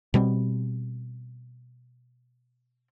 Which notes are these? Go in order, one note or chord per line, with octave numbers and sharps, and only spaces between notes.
B2 G3 C4